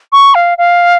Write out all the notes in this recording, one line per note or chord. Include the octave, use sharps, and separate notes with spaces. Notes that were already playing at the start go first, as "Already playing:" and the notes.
C#6
F5
F5